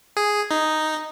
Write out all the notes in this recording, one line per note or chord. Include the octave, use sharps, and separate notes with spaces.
G#4
D#4